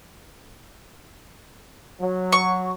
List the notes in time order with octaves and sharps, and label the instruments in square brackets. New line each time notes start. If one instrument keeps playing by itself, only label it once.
[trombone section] F#3
[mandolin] C#6